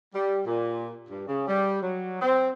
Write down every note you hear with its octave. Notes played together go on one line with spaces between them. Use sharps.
G3
A#2
G2
C#3
G3
F#3
C4